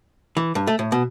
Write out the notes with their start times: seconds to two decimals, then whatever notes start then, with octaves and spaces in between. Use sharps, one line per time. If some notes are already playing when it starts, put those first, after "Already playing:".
0.37 E3
0.55 G2
0.67 A3
0.79 A2
0.92 B2